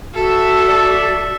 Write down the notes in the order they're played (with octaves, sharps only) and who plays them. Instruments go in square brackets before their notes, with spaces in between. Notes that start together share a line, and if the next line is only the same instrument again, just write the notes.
[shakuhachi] F#4 [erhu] A4 [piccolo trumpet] E5
[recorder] D5